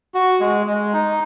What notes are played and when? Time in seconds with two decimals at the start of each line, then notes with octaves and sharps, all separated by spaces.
0.14 F#4
0.40 G#3
0.67 G#3
0.93 D#4